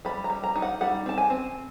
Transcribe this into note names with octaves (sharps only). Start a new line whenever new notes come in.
G3 B5
A#5
G3
A#5
D#4
F#5
G3 F#5
C4 A5
G#5
C4